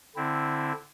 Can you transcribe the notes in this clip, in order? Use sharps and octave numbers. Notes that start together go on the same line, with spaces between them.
D3 C4 E4